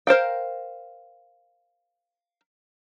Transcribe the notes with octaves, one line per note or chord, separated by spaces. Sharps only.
A#4 C5 F5 G5